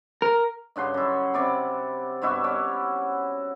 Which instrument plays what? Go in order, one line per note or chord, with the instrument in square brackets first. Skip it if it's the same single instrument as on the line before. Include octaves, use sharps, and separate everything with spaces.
[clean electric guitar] A#4
[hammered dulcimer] G2 C#3 F#5 C6
F#2 E4
C3 D5 B5
G2 B2 E4 F#4
C#4 D5 F#5